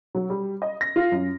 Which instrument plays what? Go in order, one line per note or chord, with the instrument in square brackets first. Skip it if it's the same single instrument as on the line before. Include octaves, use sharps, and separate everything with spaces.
[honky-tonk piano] F#3
G3
D#5
A#6
F4
F#2